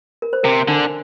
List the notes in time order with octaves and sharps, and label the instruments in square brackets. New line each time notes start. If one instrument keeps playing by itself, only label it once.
[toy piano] A#4
C5
[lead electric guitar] C3 [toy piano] A#4
[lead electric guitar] D3 [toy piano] D4